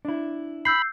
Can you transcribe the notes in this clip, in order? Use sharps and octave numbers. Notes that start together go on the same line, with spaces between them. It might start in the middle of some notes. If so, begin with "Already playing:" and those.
D4 E4
B5 E6 G6 C7